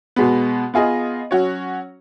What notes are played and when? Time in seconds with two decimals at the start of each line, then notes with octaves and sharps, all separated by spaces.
0.16 B2 G#3 B3
0.74 B3 F4 G#4 D#5
1.31 F#3 C#4 F#4 C#5